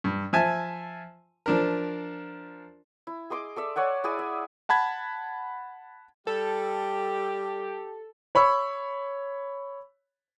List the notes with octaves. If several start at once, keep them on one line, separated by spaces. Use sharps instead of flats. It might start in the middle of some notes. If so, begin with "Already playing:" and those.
G2
F3 E5 G#5 A5 E6
F3 D4 A#4
E4
G#4 D#5 C6 D6
A4 D5 E5
C#5 D5 F#5 G#5
E4 G#4 D5 G#5
E5
F#5 A5 B5 G#6
G3 G4 A4
C#5 B5 C#6 E6